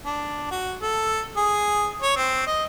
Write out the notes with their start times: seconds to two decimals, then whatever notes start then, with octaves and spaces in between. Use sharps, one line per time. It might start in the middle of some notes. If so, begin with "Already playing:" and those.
0.05 D4
0.51 F#4
0.81 A4
1.37 G#4
2.02 C#5
2.17 C4
2.47 D#5